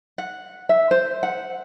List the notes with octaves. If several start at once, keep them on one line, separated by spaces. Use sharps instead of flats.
F#5
E5
C5
F#5